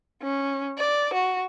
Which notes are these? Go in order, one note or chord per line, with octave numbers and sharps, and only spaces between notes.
C#4
D5
F#4